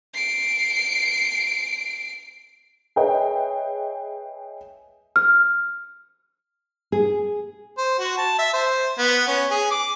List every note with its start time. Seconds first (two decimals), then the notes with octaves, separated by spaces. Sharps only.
0.14 C7 D7
2.96 G#4 B4 C#5 D#5 E5 G5
5.16 F6
6.92 G#4
7.78 C5
7.99 F#4
8.18 A5
8.38 E5
8.53 C5
8.98 B3
9.28 C#4
9.51 G#4
9.71 D6